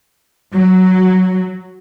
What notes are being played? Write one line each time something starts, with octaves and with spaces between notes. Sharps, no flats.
F#3